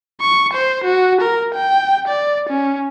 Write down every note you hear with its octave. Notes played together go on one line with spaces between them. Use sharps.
C#6
C5
F#4
A#4
G5
D5
C#4